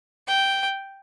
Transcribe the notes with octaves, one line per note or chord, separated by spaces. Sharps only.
G5